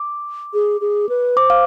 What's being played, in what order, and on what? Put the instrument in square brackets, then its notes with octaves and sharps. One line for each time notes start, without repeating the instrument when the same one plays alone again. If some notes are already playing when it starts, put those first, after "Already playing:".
Already playing: [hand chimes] D6
[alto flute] G#4
G#4
B4
[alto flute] C5 [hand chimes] D6
[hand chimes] F5